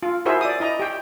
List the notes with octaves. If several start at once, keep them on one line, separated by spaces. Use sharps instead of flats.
F4
E4 F#4 G#4 A#4 C5 E5
D5 D#6
E4 D#5 A#5
G4 G5